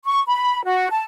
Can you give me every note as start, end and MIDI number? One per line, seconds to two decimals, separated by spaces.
0.05 0.21 85
0.28 0.64 83
0.64 0.88 66
0.90 1.03 81